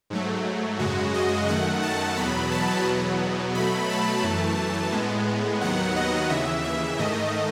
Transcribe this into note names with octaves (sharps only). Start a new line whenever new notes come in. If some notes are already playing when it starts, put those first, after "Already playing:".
G#2 F#3 A3
F#2 C#3 G#3 F#4
D#5
F#2 D#3 A3 F#5
A5
E2 B2 F#3 B3 B5
A5
E2 B2 F#3 B3
B2 F#3 A3 B5
A5
F#2 E3 A3
A2 G#3 B3
D#2 D#3 F#3 B3 F#5
D#5
D#2 C#3 E3 E5
E5
G#2 D#3 A3 D#5